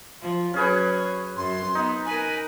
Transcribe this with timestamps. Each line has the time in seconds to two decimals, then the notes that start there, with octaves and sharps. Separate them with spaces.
0.22 F3
0.54 F#3 C#4 G#4 B4 C#5
1.36 F#2 C6
1.75 B3 D#4
2.06 A#4 B4 G#5